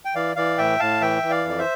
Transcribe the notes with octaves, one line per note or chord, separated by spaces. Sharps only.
G5
E3 D5 F5
E3 D5 F5
A2 E5 G5
A2 F5 A5
E3 E5 G5
E3
D5 F5
F2 D5
C5 E5